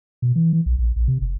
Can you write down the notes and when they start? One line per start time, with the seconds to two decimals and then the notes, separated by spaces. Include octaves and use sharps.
0.22 B2
0.36 E3
0.53 E3
0.66 B1
0.79 A#1
0.96 A#1
1.08 C3
1.21 F#1